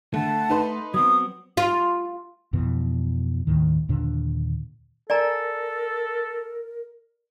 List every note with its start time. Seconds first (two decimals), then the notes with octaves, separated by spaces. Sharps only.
0.14 D3 A3 F#5 A5
0.50 D#4 B4 C6
0.94 F#3 B3 C4 D#6
1.57 F4
2.53 F2 B2 E3
3.47 D#2 A2 D#3
3.89 D#2 A#2 D3 D4
5.10 A4 A#4 D5 G#5 A#5